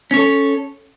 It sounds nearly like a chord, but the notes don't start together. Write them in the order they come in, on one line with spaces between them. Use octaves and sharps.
C#4 C#5 A4